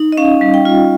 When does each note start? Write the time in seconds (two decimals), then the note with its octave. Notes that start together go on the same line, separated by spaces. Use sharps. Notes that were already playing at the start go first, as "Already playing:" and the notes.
Already playing: D#4
0.12 D#5
0.17 C#4 F5
0.41 G3
0.54 G5
0.65 F4